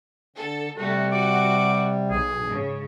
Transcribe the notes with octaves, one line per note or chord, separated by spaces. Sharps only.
D3 A4
C3 G3 A3 F#4
F#4 D6
B1 G#4
G#2 C#3